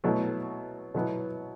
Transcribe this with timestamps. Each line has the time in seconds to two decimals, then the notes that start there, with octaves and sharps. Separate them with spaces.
0.04 B2 F#3 A3 E4
0.94 B2 F#3 B3 E4